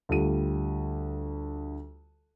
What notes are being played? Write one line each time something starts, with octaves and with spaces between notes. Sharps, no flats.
D2 G3 F4 D#7